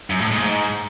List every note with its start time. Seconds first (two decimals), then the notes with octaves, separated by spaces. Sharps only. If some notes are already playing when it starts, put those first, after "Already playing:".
0.10 F#2
0.21 A2
0.31 G#2
0.42 G#2